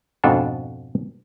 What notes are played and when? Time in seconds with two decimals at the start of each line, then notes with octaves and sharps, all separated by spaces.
0.24 F2 G#2 B2 D4 F4 A4